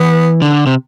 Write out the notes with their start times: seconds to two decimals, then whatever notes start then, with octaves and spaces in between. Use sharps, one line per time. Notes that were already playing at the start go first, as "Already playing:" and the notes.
Already playing: E3 B3
0.42 D3
0.66 C3